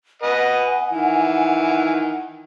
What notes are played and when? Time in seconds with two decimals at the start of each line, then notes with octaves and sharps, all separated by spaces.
0.22 B4 D#5 F#5 G#5
0.92 D#3 E3